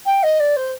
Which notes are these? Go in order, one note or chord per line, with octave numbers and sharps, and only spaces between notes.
G5
D#5
D5
C5